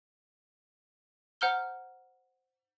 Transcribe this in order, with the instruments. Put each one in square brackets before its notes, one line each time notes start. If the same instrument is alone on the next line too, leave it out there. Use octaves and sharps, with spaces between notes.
[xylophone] C5 F#5 A#5 F6 G6 G7